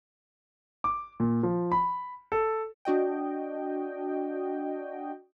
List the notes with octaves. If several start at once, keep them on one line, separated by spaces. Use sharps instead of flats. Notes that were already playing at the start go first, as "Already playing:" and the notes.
D6
A#2
F3
B5
A4
D4 F#4 D#5 G5